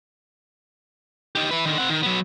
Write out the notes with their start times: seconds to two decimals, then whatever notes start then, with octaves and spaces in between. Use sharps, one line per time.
1.35 D#4 G4
1.51 E4 B4
1.65 D3 D#3
1.78 C4 F#5
1.89 D#3
2.03 F#3 B3